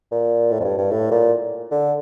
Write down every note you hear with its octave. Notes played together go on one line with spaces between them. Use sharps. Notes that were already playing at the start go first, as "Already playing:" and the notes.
A#2
A2
F2
G2
G2
A2
A#2
D3